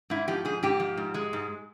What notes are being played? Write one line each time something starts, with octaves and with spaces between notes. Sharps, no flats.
G#2 E4
F3 G4
G#2 G#4
G#2 G4
F3
G#2
G#3
G#2